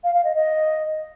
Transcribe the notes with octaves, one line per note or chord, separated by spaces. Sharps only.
F5
F5
D#5
D#5